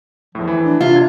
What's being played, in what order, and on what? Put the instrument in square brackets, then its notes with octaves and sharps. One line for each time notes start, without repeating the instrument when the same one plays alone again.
[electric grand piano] E2 A2 [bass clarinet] F3
[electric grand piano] E3 E4
[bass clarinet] D4
[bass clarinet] C3 [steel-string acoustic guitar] F4 [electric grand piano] E5
[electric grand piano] D4 G#6